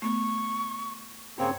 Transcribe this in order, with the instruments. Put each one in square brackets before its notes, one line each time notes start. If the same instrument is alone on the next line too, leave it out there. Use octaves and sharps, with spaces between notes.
[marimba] A3 B3 [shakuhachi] C#6
[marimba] G2 [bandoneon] C#3 A#3 C4 [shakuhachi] C#5